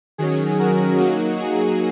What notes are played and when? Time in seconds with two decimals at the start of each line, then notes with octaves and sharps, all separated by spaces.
0.18 D#3 F#3 C#4 G#4
0.59 F#4 A#4
0.99 F#3 A#3 D#4 F#4
1.39 G#4